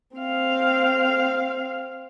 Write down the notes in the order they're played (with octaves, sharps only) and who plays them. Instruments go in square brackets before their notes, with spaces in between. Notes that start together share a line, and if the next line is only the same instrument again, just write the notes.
[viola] C4 F5